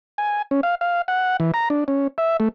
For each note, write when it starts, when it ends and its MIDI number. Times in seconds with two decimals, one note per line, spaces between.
0.18 0.42 80
0.51 0.61 61
0.63 0.75 77
0.81 1.02 77
1.08 1.37 78
1.40 1.51 52
1.54 1.69 82
1.70 1.84 62
1.88 2.07 61
2.18 2.37 76
2.40 2.48 57